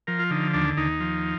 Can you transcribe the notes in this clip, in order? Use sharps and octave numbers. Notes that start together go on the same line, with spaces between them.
F3 A#4
F4
D3 D#4
D#2 D4
D#2 D#4
F3